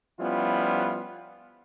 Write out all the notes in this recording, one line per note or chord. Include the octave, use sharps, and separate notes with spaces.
F3 G3 B3 C#4 E4 F4